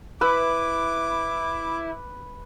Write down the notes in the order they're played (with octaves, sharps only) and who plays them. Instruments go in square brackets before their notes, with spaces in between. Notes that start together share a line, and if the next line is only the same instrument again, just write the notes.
[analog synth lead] E4 [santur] B4 [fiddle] D6